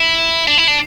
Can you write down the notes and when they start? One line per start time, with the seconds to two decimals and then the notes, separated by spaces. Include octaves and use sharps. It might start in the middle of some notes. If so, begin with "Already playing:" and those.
Already playing: E4
0.48 D4
0.58 E4
0.68 D4